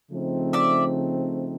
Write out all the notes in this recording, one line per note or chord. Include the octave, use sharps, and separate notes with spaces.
C#3 F3 A3 C4 D#4
D5 E5